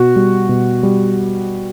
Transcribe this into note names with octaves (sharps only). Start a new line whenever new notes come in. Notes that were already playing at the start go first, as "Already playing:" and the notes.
Already playing: B2 F#4
G3
B2
G3